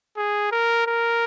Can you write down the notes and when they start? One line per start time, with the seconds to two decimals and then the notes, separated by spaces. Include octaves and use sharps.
0.17 G#4
0.52 A#4
0.86 A#4